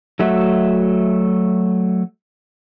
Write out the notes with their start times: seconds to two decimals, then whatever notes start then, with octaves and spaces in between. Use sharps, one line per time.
0.19 F#3 A3 F#4 E5